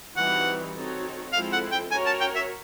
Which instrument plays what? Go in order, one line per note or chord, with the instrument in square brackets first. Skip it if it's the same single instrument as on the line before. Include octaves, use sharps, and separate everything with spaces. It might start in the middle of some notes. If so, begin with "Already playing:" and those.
[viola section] E3 G3 C4 D#4 F#4 [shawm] F#5
[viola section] C4 D#4 F#4 A4 C#5
[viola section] F3 G#3 C4 E4 A4 [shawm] F5
[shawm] F#5
G5
[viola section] C#4 F#4 A#4 C#5 [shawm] G#5
[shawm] A5
G5
E5